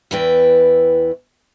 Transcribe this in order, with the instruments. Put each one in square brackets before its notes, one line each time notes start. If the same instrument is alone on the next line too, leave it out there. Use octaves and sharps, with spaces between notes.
[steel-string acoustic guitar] E2 E3 E4 B4 D5 G5